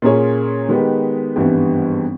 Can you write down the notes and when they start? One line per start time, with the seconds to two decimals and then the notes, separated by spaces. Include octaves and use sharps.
0.02 A#2 A#3 C#4 G#4 C#5
0.69 D#3 G#3 B3 G4 B4
1.36 G#1 G2 E3 G3 B3